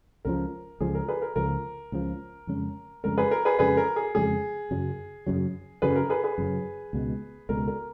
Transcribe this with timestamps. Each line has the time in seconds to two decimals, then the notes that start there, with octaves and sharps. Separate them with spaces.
0.25 C#2 C#3 F3 A#4
0.80 C#2 C#3 F3 G#4
0.95 A#4
1.08 G#4 B4
1.22 A#4
1.36 C#2 C#3 F3 A#4
1.92 C#2 C#3 F3
2.47 F2 C#3 G#3 C#4
3.04 F2 C#3 G#3 C#4 A#4
3.18 G#4 B4
3.31 A#4
3.45 G#4 B4
3.59 F2 C#3 G#3 C#4 G#4 B4
3.77 A#4
3.96 G#4
4.15 F2 C#3 G#3 C#4 G#4
4.71 F#2 C#3 F#3
5.27 F#2 C#3 F#3
5.82 F#2 C#3 F#3 G#4 B4
5.96 A#4
6.10 G#4 B4
6.24 G#4 B4
6.38 F#2 C#3 F#3
6.93 C#2 B2 G#3
7.49 C#2 B2 G#3 A#4
7.68 A#4